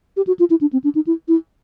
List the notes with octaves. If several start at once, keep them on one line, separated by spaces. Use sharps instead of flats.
G4
F#4
F4
E4
D4
C4
D4
D#4
E4
E4